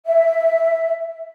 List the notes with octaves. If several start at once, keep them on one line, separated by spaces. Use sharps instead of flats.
E5